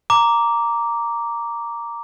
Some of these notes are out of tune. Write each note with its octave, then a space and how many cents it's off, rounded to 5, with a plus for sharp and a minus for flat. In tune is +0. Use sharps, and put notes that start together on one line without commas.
A#5 +0 D6 -10